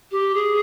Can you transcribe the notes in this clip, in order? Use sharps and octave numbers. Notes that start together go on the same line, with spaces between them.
G4
G#4